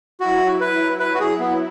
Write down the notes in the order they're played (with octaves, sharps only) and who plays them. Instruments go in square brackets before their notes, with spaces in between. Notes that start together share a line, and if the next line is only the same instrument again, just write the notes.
[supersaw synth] F#3 E4 [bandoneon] F#4
[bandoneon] B4
B4
F#4
G#4
B3